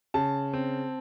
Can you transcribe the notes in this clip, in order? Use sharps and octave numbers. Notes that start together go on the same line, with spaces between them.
C#3 A5
C4